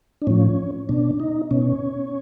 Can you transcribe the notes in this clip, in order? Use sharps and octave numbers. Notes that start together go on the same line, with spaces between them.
D4
A2 F3 C#4
B2 D4
D#4
B2 C#4